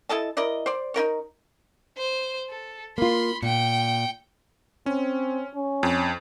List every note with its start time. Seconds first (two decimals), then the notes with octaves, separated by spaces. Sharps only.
0.09 E4 A4 D#5 A5
0.37 E4 A#4 D5 D#5
0.66 C5 D5
0.94 D#4 E4 A#4 C#5
1.97 C5
2.49 A4
2.98 A#3 F4 B5 C6
3.43 A#2 G5 C#7
4.86 C4 C#4
5.54 C#4
5.83 F2